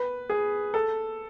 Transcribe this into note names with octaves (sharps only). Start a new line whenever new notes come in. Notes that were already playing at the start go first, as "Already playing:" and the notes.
Already playing: B4
G#4
A4